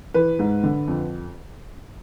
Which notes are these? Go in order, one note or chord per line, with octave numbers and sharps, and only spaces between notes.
E3 B4
G#2
D3
F2